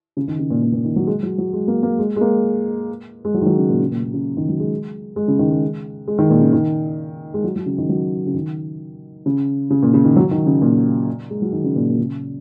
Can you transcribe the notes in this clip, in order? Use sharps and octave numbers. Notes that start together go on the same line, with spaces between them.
C#3
D#3
C#3
A#2
A#2
A#2
D#3
F#3
G#3
F#3
F#3
G#3
A#3
A#3
G#3
G#3
A#3
G#3
F#3
D#3
F#3
C#3
A#2
C#3
A#2
A#2
C#3
D#3
F#3
G#3
G#3
C#3
D#3
G#3
G#3
D#3
A#2
C#3
D#3
G#3
F#3
F#3
C#3
D#3
F#3
C#3
D#3
C#3
C#3
A#2
C#3
D#3
F#3
D#3
C#3
A#2
G#3
F#3
D#3
C#3
A#2
A#2
C#3